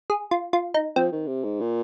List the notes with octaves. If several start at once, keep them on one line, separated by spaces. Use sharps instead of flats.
G#4
F4
F4
D#4
F3 C4
D#3
C3
G#2
A#2